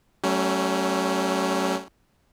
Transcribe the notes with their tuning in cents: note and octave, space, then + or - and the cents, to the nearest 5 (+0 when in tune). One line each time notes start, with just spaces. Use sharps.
F#3 +45 A3 +0 C#4 +0